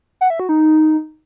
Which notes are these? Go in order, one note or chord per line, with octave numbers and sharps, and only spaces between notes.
F#5
E5
F#4
D#4